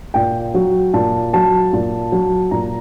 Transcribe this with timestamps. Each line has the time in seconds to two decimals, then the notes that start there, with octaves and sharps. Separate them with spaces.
0.14 A#2 G5
0.54 F#3
0.93 A#2 A5
1.33 F#3 A5
1.73 A#2
2.12 F#3
2.51 A#2 A#5